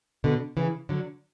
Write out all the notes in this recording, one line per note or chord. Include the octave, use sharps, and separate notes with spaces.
B2 D3
C#3 E3
D3 F#3